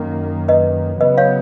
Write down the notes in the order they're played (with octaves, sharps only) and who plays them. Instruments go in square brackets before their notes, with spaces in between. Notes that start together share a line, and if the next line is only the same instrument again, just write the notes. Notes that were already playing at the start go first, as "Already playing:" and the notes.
Already playing: [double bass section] F#2 D#3 A#3
[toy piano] B4 D#5
[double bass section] C#3 F#3 B3 [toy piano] B4 D#5
[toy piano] C#5 F5